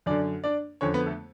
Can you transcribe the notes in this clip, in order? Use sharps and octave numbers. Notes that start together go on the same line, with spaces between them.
F#2 D3 D4 D5
D4 D5
F2 D3 C#4 C#5
B3 B4
A3 A4